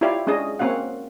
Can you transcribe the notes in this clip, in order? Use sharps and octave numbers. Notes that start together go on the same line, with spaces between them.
E4 F4 G4 C#5 D5 F5
G#3 C#4 D4 G#4 D#5
A#3 C4 C#4 F#4 F5 F#5